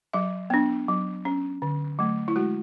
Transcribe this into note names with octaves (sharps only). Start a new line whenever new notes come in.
F#3 E5
B3 D4
F#3
C#4
D3
F#3 A3
E4
G#3 F#4